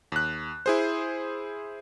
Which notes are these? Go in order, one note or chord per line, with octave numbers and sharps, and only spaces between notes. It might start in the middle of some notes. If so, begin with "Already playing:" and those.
D#2 F#6
E4 G#4 C5